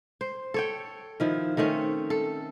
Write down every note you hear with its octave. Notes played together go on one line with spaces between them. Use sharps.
C5
A4 C#5 G5
D#3 F3 E4
D#3 A3 C4 C#4
A4